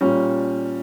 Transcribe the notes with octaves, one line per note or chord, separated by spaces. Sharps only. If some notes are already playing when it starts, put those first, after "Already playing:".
A#2 G3 C#4